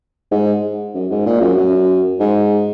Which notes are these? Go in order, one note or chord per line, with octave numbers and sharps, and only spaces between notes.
G#2
F#2
G#2
A#2
F#2
F#2
G#2